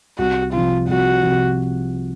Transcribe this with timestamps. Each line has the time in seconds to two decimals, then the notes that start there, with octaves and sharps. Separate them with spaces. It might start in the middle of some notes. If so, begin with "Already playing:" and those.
0.18 C2 F#4
0.53 C3 F3 F4
0.88 C2 F#4
1.23 C3 F3